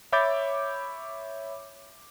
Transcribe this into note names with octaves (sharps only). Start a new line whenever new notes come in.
C#5 E5 B5 D6 G6 A6